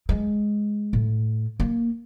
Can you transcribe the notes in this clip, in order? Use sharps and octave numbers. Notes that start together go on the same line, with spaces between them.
G#3
A2
A#3